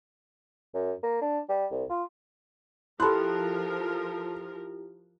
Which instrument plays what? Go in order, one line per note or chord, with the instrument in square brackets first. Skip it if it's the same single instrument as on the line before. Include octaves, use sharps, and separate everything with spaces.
[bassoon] F#2
A#3
D4
G3
C2
F4
[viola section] F3 A#4 [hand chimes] E4 G4 [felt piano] A4 F#6 [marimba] B5 C6